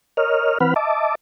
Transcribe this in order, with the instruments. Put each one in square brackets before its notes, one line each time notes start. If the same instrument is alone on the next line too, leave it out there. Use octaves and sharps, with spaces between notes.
[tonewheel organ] A#4 C#5 D#5 F6
E3 C4 B4 F#5 B5 F6
D#5 E5 A5 D6